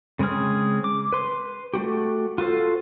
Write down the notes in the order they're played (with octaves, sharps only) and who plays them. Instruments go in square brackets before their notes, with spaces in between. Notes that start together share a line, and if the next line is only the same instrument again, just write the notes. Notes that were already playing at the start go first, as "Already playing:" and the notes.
[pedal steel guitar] C#3 G#3 C4 G#4 F6
D6
B4 C6
A3 D4 F#4 G4
F4 F#4 A4 C5